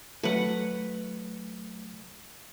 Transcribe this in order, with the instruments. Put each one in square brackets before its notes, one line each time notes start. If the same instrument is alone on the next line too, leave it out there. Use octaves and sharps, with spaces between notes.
[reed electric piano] F#3 A3 [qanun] B4 F#5